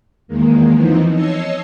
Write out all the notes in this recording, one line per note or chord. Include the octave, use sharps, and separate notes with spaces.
E2 D#3 G#3 A#3
E3 F3 B3 C4 D#4
C#5 D#5 A5 E6 G#6 C7